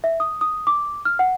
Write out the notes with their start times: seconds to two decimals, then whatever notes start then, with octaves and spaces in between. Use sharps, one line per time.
0.04 E5
0.20 D#6
0.41 D#6
0.67 D6
1.05 F6
1.19 F#5